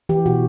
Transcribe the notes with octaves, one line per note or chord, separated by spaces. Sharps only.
E3 G4
B2 F#4